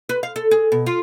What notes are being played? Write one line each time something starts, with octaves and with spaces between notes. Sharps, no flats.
B4
F5
A4
G#4
B2
F4